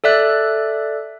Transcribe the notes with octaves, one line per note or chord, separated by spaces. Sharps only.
A4 D5 E5 F#6